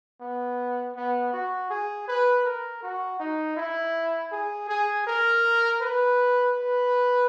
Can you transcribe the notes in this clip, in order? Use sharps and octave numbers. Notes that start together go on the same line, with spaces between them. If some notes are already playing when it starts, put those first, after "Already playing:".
B3
B3
F#4
G#4
B4
A#4
F#4
D#4
E4
G#4
G#4
A#4
B4
B4